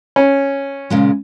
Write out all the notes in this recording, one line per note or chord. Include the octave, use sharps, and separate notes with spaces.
C#4
A#2 C#3 G#3